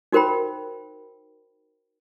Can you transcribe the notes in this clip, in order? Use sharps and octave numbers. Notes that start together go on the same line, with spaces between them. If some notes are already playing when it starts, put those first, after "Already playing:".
D#4 F#4 A#4 C5 G5 B5